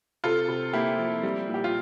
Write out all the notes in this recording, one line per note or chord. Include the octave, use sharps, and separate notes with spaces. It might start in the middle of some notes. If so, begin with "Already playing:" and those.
C3 F4 A4
C3
A#3 E4 G4
F3
G3
A#2
G4
F4